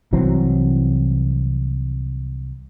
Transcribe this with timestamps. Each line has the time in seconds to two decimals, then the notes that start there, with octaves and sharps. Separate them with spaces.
0.13 C2 E3 F#3 C4